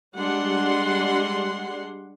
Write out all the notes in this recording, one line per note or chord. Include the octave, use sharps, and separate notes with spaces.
G3 G#3 D4 F#5 C6